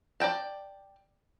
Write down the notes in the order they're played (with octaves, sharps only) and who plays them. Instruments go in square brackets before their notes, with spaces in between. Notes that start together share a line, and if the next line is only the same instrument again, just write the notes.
[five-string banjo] D5 D#5 G5 A5